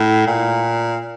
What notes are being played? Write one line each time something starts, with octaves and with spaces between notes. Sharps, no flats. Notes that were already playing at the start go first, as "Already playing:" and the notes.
Already playing: A2
A#2